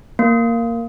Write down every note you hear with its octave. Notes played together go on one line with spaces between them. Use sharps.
A#3